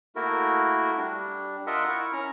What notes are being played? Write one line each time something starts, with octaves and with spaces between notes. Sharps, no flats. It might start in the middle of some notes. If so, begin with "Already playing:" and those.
A3 A#3 E4 F#4 A#4
G3 D4
F4 A#4 D#5 E5 F#5
E4 A#4 C#6
C#4 A#5